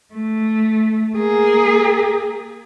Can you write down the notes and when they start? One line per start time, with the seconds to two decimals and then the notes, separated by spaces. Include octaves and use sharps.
0.14 A3
1.17 A#3 G#4